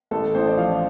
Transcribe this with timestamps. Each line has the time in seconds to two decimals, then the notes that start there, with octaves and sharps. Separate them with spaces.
0.11 A1 A4
0.34 A1 C5
0.47 D5
0.57 F3 F5